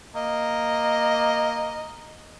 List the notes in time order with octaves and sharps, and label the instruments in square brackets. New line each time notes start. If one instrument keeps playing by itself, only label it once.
[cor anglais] A#3 [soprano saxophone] D#5